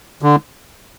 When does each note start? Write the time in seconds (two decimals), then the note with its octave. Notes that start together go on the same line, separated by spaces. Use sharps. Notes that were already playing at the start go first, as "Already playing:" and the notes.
0.22 D3